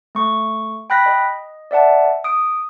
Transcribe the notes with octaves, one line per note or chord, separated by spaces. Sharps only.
A3 C#6
G5 B5 F#6 A#6 B6
D#5
D5 E5 F#5 A5
D#6 D7